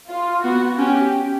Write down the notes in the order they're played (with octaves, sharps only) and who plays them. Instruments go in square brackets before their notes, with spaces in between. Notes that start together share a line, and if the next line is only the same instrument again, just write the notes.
[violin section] F4
[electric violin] B3 [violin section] F#4
[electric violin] C#4 [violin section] G4